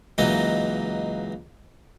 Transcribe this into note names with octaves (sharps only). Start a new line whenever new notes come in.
C#2 E3 F#3 A#3 D#4 D#5